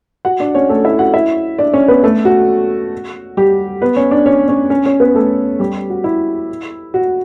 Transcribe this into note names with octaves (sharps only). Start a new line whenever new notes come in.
F#4 F#5
D4 D5
C#4 C#5
A3 A4
E4 E5
F#4 F#5
E4 E5
D4 D5
C#4 C#5
B3 B4
A3 A4
F#4
G3 G4
B3 B4
C#4 C#5
D4 D5
C#4 C#5
C#4 C#5
C#4 C#5
C#4 C#5
B3 B4
A3 A4
G3 G4
F#4
E4
F#4